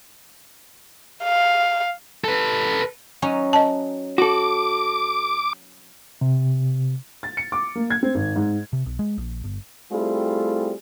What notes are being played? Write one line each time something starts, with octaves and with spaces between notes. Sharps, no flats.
F5
A4 B4
F#3 C#4 D#4
D#5 A5
F#4 A4 D6
C3
A6
C#7
D6
A#3
G#6
C4
G#1
G#2
C3
B1
G#3
A#1
G1
G3 A3 C4 E4 F4 G#4